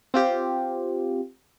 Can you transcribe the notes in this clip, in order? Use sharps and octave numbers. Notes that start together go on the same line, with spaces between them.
C4 F4 G4